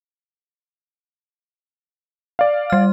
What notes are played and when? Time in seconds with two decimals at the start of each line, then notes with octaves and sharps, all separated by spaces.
2.39 D5 F5
2.70 G3 F6